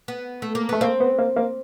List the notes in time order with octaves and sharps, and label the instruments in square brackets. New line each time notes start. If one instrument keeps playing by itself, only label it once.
[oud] B3
A3
A#3
[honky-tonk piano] A3 [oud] B3
[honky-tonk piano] A#3 [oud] C4
[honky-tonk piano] B3
A#3
A#3